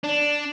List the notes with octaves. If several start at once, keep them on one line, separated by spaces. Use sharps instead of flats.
D4